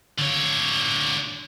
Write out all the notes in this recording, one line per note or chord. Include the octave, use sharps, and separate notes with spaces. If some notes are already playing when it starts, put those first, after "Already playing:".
D3 C#5